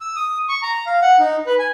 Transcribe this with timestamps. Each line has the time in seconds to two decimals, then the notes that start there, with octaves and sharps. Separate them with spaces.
0.01 E6
0.16 D#6
0.49 C#6
0.63 A#5
0.87 F5
1.02 F#5
1.20 D#4
1.47 B4
1.59 G#5